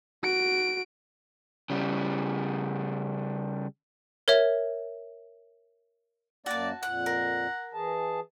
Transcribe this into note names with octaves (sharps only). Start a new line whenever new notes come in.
F#4 D7
C#3 G3
A#4 C#5 E5
F#2 A#3 F#4 D5 A5
F2 A#2 F#5 F#6
A#4
E3 G#4 A5